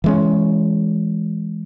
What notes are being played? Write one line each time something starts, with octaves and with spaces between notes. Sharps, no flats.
E3 G#3 C#4